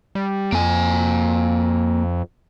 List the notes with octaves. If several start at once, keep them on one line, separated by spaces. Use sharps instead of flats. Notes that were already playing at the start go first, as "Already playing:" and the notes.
G3
F2 A#3 G#5